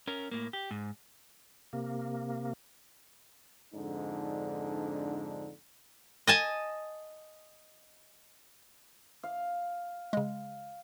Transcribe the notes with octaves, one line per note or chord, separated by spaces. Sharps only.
C#4 A#4
A2 A#3
G4
G#2
C3 A#3
F2 G#2 D3 D4 D#4
D#5 G#5 A5
F5
C#3 G#3